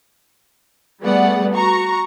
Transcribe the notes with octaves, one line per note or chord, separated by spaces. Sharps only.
G3 A3 B3 G#4 D5 F#5
F#4 A#5 C#6